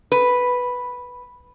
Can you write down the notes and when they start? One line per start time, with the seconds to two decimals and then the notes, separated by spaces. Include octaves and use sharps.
0.12 B4